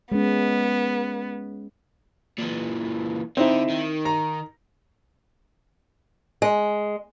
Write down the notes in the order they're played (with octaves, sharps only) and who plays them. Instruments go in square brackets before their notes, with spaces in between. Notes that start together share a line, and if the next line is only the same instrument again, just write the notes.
[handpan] G#3 C#4 [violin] B3
[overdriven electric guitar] A#2 E3
[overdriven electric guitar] D3 [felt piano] C4 D#4 E4
[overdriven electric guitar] D#3
[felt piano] A#5
[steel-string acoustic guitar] G#3